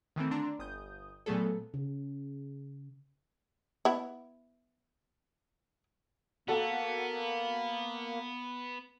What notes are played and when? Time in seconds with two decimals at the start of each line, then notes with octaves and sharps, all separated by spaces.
0.16 D#3 E3 A3 C4
0.31 D3 D4 A#5 C6
0.59 G1 D#6 G6
1.26 A#2 F#3 A3 B3 G#4 A4
1.74 C#3
3.85 B3 E4
6.48 A#3 B3 F#4 A4